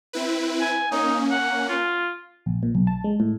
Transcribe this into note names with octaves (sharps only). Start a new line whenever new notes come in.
C4 E4 B4
G#5
A#3 C#4 D#4
F#5
F4
A#1
A#2
B1
A5
G#3
A2